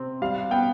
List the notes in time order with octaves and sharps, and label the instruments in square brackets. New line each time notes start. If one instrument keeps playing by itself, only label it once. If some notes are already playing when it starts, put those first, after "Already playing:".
Already playing: [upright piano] C3 C4
G3 F5
B3 G5